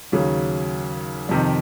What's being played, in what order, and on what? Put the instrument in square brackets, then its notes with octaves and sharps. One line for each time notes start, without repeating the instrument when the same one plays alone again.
[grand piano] D#2 C#3 F#3
F2 C3 D#3